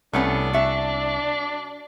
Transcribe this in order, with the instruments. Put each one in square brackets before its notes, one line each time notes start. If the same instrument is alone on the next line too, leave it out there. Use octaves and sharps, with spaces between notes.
[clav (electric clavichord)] C2 [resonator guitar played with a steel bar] A3 B3 C#4 [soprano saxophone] D4
[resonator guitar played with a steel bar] F#4 E5